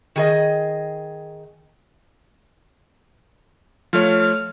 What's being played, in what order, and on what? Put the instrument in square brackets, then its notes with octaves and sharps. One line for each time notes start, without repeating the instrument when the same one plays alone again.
[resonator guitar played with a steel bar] D#3 G#4 D#5
[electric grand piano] F3 A3 C#5 [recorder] F6